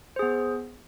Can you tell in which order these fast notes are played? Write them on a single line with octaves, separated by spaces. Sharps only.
C5 G#4 B3